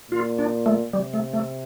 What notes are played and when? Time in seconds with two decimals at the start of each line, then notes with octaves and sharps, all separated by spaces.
0.11 A#2 F4
0.39 D4
0.66 A3
0.93 C3 G3
1.14 A3
1.33 A3